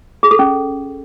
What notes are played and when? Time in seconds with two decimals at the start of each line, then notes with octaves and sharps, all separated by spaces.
0.23 G#4
0.31 A4
0.39 C#4